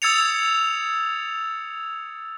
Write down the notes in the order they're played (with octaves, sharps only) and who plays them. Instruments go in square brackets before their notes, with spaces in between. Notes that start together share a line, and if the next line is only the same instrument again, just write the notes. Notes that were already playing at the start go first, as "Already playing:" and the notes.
[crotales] D#6 E6 G#6 A6 C#7 F7